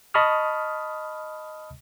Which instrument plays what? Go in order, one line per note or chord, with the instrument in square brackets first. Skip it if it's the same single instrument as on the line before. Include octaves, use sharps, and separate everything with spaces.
[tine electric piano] D#5 A5 B5 C#6 D#6 F6